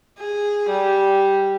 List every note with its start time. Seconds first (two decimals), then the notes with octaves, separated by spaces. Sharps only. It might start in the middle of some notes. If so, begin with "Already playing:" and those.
0.19 G#4
0.69 G3